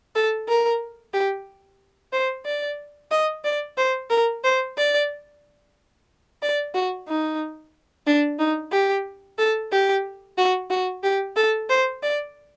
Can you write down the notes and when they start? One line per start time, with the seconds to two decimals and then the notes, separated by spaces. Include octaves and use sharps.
0.15 A4
0.48 A#4
1.13 G4
2.13 C5
2.45 D5
3.11 D#5
3.45 D5
3.77 C5
4.10 A#4
4.44 C5
4.77 D5
6.42 D5
6.74 F#4
7.08 D#4
8.06 D4
8.39 D#4
8.72 G4
9.38 A4
9.72 G4
10.38 F#4
10.70 F#4
11.03 G4
11.36 A4
11.70 C5
12.03 D5